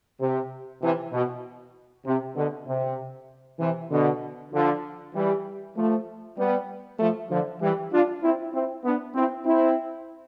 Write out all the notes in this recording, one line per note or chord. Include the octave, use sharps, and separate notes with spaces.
C3
C3 E3
B2
C3
B2 D3
C3
C3 E3
B2 D3
D3 F3
E3 G3
F3 A3
G3 B3
F3 A3
D3 F3
E3 G3
D4 F4
C4 E4
C4 E4
B3 D4
C4 E4
C4 E4